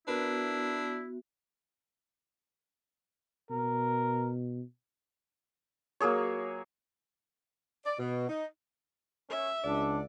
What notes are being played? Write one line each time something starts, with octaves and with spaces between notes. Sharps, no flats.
B3 D4 E4 F#4 A#4 B4 E5
B2 A#4
F#3 A#3 G#4 C#5
D5
B2
D#4
C#4 A#4 C#5 E5
C#2 D4 G#4 D5 F#5